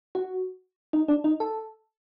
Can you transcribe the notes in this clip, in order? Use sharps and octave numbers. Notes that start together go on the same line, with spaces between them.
F#4
D#4
D4
D#4
A4